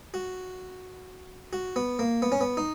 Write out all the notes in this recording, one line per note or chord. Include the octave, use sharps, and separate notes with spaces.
F#4
F#4
B3
A#3
B3
C#4
B3
D#4